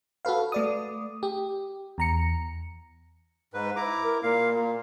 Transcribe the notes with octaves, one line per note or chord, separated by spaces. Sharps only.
F#4 A4 B4 F5
A3 D5 D#6
G4
E2 A#5 C#7
G#2 B4
E4 A#5 D6
A#4
A#2 A#3 F5
A#2